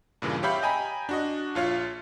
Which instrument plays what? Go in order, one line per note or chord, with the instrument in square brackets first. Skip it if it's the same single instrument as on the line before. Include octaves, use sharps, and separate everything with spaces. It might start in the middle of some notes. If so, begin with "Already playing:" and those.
[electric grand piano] G2 A#2 C#3 E3
G4 C#5 E5 F5 B5 G6
D#5 G5 G#5 A#5 B5
D4 F#4 D#5
A#1 F4 C#5 F5